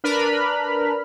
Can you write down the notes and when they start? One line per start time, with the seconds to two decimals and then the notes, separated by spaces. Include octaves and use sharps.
0.04 D4 A#4 B4 B5 F6